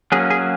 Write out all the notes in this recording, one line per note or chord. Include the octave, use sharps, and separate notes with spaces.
F#3 A#3 C#4 G#4
G#4